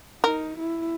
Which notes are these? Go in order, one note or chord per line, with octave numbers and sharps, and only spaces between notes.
D#4 A#4
E4